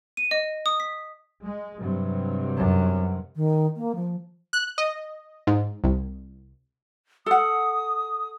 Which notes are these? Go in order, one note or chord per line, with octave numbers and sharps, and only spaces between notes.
D#7
D#5
D#6
B6
G#3
G2 C3 F#3
F#2
D#3
A#3
F3
F#6
D#5
G#2
C2
A4 F#5 D#6